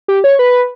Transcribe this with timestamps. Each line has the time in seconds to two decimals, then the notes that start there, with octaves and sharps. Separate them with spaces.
0.08 G4
0.24 C#5
0.39 B4